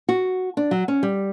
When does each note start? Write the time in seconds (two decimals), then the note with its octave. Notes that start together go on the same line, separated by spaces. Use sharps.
0.09 F#4
0.57 D4
0.71 F#3
0.88 C#4
1.03 G3